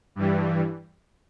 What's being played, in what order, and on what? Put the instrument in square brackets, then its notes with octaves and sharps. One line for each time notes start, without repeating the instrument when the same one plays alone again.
[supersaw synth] G2 E3 G3